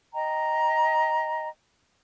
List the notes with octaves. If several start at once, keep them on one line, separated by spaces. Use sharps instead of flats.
D#5 G5 A#5